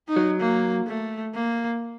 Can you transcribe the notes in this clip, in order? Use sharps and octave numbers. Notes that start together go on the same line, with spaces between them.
D#4
F#3
A#3
A3
A#3